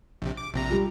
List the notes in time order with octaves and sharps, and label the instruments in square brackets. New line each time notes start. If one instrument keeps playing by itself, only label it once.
[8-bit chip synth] A#1 C3
D6
A#1 C3 A#5
[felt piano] G3 F4